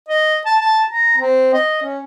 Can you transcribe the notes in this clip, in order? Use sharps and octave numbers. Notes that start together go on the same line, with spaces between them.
D#5
A5
A5
A#5
C4
D#5
C#4